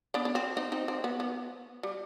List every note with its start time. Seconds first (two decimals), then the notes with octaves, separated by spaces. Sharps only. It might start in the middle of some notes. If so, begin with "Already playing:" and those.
0.14 B3 D4
0.25 D4
0.35 C4
0.57 C4 D#4
0.72 C4 D#4
0.88 C4
1.04 B3
1.20 B3
1.83 G3